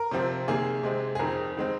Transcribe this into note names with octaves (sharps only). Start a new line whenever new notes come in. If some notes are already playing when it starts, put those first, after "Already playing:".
Already playing: A#4
C3 F3 C4
C3 D#3 A#3 G#4
C3 G#3 C4
G#4
F2 D#3 C4 A#4
D#3 G#3 C4